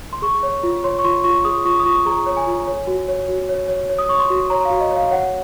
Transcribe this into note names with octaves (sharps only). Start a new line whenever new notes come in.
C6
G#4 C#6
C#5
F4
C#5 C6
C#6
F4 C6
F4 C#6
G#4 D#6
F4 C#6
D#6
F4 C#6
G#4 A#5
C#5
G#5
F4
C#5
F#4
C#5
F#4
C#5
C#5
C#5
D#6
C#5 C#6
C6
F#4
C#5 A#5
F5
F#4
D#5
C#5
F5
C#5 F#5